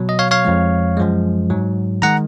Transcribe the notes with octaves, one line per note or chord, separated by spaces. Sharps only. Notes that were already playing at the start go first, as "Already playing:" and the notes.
Already playing: B2 F#3
D#5
C#5 F5
C#5 F5
F2 F3 G#3
F#2 F3 G#3
G#2 F#3
D#3 G#3 F#5 A#5